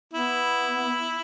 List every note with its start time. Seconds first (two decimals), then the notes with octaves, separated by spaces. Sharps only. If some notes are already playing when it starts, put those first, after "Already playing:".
0.13 B3 E4